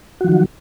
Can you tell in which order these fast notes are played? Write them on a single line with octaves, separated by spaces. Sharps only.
F#4 F3 D#3 F#3